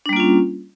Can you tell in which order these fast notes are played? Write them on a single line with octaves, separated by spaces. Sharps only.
D4 G3 A#3 F4 C#4